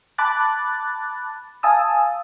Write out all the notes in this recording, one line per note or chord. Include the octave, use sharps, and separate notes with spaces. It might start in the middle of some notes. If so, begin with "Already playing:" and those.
A5 B5 D6 F#6 A6
F5 G#5 A5 D#6 E6